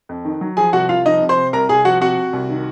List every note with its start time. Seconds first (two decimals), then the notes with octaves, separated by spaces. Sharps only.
0.09 F2
0.25 D#3
0.41 F#3
0.57 F3 G#4 G#5
0.73 C2 F#4 F#5
0.89 C2 F4 F5
1.06 F3 D#4 D#5
1.22 C3
1.29 C5 C6
1.37 C3
1.53 C2 A#4 A#5
1.69 C2 G#4 G#5
1.85 F3 F#4 F#5
2.01 C3 F#4 F#5
2.17 C3
2.33 C2
2.50 D#3